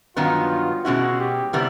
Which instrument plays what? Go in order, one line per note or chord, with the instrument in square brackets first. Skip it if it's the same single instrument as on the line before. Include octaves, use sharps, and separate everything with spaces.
[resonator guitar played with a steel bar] G2 D#3 F#3 B3 D#4 [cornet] F4
[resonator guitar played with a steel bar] B2 G#3 C#4 E4 [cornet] F#4
[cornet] G4
[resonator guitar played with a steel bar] C3 E3 G3 B3